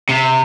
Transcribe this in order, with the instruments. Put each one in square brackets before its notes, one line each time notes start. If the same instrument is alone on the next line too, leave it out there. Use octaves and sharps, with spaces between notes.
[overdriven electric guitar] C3